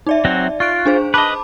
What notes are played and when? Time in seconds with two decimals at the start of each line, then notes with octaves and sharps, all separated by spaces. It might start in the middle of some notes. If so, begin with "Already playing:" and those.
0.07 D#4 D5 E5
0.25 F#3 C4 F#4
0.60 F4 C#6 F#6 D7
0.86 D4 G#4 C5
1.14 B4 D#5 A5 B5 D6